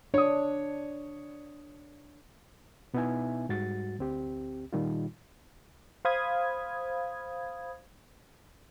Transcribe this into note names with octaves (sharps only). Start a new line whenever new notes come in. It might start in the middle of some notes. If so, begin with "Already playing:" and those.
D4 C#5 D#6
B2 B3 D#4 E4 E5 G#5
G#2 G3 F#4 A6
D2 C4 G4
A#2 D#3 G3 D#4 F4
C5 F5 B5 D#6 G#6